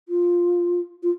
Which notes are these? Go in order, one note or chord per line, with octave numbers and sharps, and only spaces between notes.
F4
F4